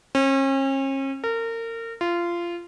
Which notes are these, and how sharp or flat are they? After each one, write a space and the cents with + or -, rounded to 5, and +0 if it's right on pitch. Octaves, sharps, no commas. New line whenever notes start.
C#4 -40
A#4 -30
F4 -20